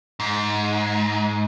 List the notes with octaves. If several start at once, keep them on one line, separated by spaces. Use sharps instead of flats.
G#2